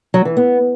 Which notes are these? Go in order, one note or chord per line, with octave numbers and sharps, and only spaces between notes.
F#3
E3
B3